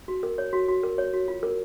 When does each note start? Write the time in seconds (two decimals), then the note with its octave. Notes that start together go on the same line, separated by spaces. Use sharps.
0.08 F#4
0.23 A#4
0.38 C#5
0.53 F#4
0.68 F#4
0.83 A#4
0.98 C#5
1.13 F#4
1.28 F4
1.43 A#4